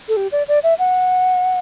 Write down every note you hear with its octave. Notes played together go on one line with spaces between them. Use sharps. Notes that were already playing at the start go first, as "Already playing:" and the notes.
A4
G4
D5
D5
E5
F#5